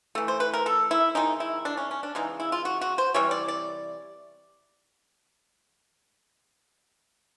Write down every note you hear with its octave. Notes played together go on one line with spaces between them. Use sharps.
E3 A3
C5
B4
A#4
A4
E4
C3 D#3 G#3 D#4
E4
D4
C#4
C#4
D4
C#3 E3 G#3 D#4
E4
F4
F#4
F#4
C5
C3 E3 G3 C#5
D5
D5